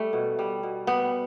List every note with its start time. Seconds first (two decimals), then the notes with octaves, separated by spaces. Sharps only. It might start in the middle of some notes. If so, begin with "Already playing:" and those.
Already playing: G3 A3
0.13 B2
0.39 G3
0.63 B2
0.87 G3 B3